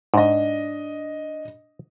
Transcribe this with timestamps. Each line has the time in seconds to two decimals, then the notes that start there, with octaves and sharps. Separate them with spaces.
0.14 G#2 D4 D#5